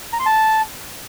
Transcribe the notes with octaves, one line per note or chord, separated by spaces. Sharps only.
A#5
C6
A5